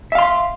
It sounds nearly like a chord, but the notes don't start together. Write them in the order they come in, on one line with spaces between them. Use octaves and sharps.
E5 F5 C6